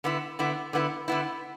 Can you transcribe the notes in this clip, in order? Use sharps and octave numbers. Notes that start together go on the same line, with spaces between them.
D3 B3 E4
D3 B3 E4
D3 B3 E4
D3 B3 E4